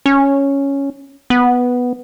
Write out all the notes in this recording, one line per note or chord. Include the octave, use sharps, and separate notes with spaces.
C#4
B3